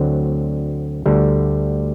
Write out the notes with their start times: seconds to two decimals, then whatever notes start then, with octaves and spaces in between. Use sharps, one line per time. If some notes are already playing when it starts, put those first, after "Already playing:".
Already playing: D2 D3 F#3 C4
1.06 D2 D3 G3